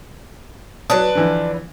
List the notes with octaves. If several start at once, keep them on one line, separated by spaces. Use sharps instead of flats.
F#3 D4 B4 C#5 D#6
D3 E3 F3